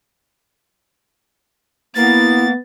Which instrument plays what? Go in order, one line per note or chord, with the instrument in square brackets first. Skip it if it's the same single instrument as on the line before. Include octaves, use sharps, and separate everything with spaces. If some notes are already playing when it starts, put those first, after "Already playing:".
[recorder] A#3 [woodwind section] B3 [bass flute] E4 [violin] A6